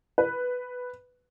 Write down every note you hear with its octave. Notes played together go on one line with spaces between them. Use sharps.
B4